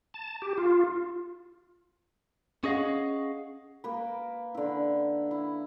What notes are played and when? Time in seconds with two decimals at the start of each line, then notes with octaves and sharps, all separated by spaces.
0.14 A5
0.42 G4
0.58 F4
2.64 C#4 G#4 D#5 F5 F#5
3.84 A#3 B4
4.55 D3 E4
5.31 E4